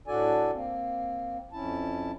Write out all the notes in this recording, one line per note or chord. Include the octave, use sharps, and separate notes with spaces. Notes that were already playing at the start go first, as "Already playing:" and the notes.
A2 D4 F#4 A4 D5 G#5
A#3 C4
F2 C#4 E4 A5